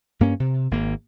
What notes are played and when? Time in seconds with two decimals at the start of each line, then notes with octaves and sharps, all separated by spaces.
0.20 G2 A#3 C#4
0.40 C3
0.71 G#1 A#3